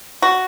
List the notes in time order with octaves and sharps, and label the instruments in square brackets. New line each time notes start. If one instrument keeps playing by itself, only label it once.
[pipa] F#4